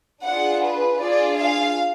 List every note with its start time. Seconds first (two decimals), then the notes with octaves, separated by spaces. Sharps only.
0.23 D4 F4 G#4 F#5
0.62 B4
0.99 D4 F4 G#4 D5
1.37 F5